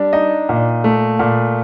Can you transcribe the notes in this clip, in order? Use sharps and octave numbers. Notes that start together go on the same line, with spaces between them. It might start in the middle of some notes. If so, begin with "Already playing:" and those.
Already playing: G3 D4
D#4 D#5
A#2
A3
A#2